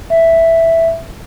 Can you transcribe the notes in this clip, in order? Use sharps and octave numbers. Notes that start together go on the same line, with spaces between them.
E5